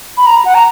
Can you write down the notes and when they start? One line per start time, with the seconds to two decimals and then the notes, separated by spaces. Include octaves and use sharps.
0.18 B5
0.27 A#5
0.45 F#5
0.55 A#5